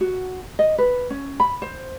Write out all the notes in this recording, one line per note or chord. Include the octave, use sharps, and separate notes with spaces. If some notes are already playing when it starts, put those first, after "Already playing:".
F#4
D#5
B4
C#4
B5
C5